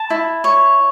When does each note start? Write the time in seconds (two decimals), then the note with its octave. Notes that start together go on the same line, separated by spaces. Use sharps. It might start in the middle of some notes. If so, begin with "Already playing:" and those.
Already playing: A5
0.10 E4
0.44 C#5